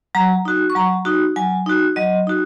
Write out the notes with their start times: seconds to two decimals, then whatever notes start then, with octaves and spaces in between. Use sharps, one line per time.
0.15 F#3 A#5
0.45 D#4 F#4
0.70 C#6
0.75 F#3 A#5
1.05 D#4 F#4
1.36 F#3 G#5
1.66 D#4 F#4
1.96 F#3 D#5
2.27 D#4 F#4